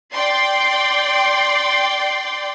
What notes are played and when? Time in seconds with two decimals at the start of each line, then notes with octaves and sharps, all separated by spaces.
0.13 D5 G5 C6